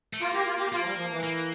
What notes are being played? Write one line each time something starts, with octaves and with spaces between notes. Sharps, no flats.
A3
A#3 F4
G4
F4
G4
A#3 F4
F3
G3
F3
E3
A#3